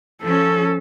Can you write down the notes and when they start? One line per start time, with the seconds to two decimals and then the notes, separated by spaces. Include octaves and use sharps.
0.23 F3 C#4 A4